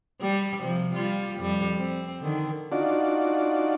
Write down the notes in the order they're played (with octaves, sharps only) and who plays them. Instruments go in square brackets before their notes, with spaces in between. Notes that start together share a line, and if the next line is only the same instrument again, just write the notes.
[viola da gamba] G3
C3 F3
G3 F4
F2 G3
C4
D3 D#3
[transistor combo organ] D4 D#4 F4 F#4 D5